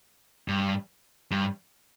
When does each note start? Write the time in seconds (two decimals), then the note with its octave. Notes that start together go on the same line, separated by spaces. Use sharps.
0.48 G2
1.31 G2